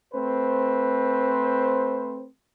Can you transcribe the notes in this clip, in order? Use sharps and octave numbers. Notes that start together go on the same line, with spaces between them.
A3 C4 B4 C5